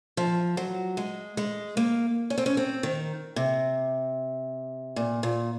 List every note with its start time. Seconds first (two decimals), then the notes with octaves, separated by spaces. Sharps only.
0.17 F3
0.57 F#3
0.97 G#3
1.37 G#3
1.77 A#3
2.30 C#4
2.38 C4
2.46 C#4
2.57 C4
2.83 D#3
3.36 C3
4.96 A#2
5.23 A#2